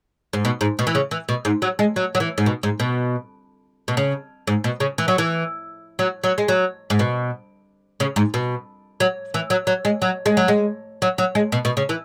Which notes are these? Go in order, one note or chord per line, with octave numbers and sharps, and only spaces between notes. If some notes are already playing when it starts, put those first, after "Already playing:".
G#2
B2
G#2
B2
E3
C#3
E3
B2
G#2
F#3
G#3
F#3
F#3
E3
G#2
B2
G#2
B2
B2
C#3
G#2
B2
C#3
E3
F#3
E3
F#3
F#3
G#3
F#3
G#2
B2
C#3
G#2
B2
F#3
E3
F#3
F#3
G#3
F#3
G#3
F#3
G#3
F#3
F#3
G#3
B2
B2
C#3
E3